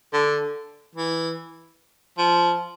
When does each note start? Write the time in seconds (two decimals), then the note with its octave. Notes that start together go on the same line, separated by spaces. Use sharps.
0.13 D3
0.95 E3
2.18 F3